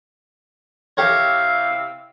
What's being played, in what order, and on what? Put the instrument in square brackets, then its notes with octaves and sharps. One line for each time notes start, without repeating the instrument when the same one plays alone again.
[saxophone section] C3 E4 F5 [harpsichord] G4 A#4 C#5